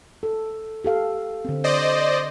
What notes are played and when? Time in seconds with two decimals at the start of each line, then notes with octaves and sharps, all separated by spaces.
0.23 A4
0.84 G4 A4 F5
1.45 D3 C4
1.64 C5 D5 D#5